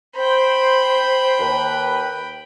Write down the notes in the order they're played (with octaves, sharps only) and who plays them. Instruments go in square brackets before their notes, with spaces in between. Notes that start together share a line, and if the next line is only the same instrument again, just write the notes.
[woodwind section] C5 [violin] G5 B5
[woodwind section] D#2 B4